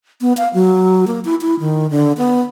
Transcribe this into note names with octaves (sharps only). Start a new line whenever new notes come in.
B3
F5
F#3
A#3
E4
E4
D#3
D3
B3